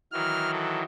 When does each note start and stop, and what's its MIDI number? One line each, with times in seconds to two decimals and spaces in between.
0.13 0.83 51
0.13 0.83 52
0.13 0.83 54
0.13 0.52 89
0.53 0.80 69